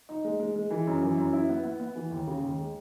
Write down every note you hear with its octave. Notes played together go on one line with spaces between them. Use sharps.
D#4
G#3
G#3
G#3
E3
F#2
E3
F#2
E4
B3
B3
B3
E3
D#2
C#3
D#2
G#3